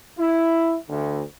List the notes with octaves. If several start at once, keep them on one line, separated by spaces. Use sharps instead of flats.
E4
D2